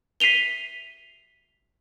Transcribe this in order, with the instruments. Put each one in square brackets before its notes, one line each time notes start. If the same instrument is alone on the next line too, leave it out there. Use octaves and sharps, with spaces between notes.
[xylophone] B6 C7 D#7 F7 G7